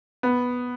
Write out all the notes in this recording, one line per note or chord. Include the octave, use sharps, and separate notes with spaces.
B3